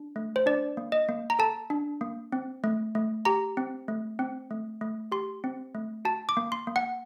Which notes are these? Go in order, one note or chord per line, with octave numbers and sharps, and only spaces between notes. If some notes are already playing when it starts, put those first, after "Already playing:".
Already playing: D4
A3
C5
D4 D5
A#3
D#5
A#3
A#5
A4 A5
D4
A#3
C4
A3
A3
G4 A#5
C4
A3
C4
A3
A3
G4 C6
C4
A3
F#4 A5
D6
A#3
C6
A#3
F#5